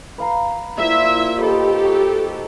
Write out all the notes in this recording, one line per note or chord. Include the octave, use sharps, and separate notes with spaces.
B4 F5 A#5
A#2 E4 F4 C5 E5
D#4 G4 A4 B4 C5
F#4